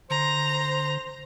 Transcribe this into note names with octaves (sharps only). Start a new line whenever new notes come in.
D3 C5 A#5